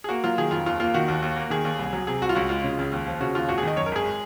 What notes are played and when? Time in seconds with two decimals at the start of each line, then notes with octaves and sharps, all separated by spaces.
0.04 G#4
0.09 A#3 F#4
0.24 F#3 F4
0.38 D#3 G#4
0.51 F2 F4
0.66 D#2 F4
0.80 A#3 F4
0.94 D#3 F#4
1.08 D#2
1.22 D#2
1.36 A#3
1.50 D#3 G#4
1.65 D#2
1.79 C2
1.93 F#3
2.07 C3 G#4
2.22 C2 F#4
2.29 F4
2.35 C#2 F#4
2.49 G#3 F4
2.64 C#3
2.78 C#2
2.92 D#2
3.07 F3
3.21 C#3 F#4
3.35 D#2 F4
3.48 G#1 F#4
3.58 G#4
3.63 D#3 D#5
3.76 F#2 C#5
3.86 A#4
3.92 G#1 G#4
4.06 G#3